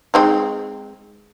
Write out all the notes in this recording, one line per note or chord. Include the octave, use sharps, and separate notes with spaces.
G#3 C4 D#4